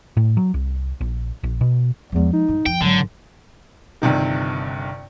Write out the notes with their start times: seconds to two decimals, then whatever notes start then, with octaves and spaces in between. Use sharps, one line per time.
0.17 A2
0.37 F#3
0.54 C2
1.01 A#1
1.43 A#1
1.61 B2
2.12 E2 F3 G#3
2.33 D#4
2.48 G2
2.66 F2 G5
2.81 G#1 D3 F#3
4.02 G1 G2 C3 D#3